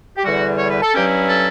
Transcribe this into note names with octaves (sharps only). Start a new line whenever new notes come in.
G4
E2 D3 G3 F#4
C#5
B4
A4
G2 F#3 C#4 E4 G4
A4